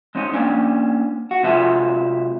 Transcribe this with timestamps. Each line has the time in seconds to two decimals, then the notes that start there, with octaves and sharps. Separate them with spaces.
0.15 G#3 C4 C#4 D#4
0.33 A#3 C#4 D4
1.31 F#4
1.43 C3 G#3 F4 F#4 E5 A5